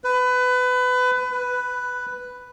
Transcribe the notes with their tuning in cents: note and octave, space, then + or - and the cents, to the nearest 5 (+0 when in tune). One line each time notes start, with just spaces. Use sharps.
B4 +25
B4 +5